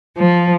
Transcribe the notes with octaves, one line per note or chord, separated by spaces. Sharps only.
F3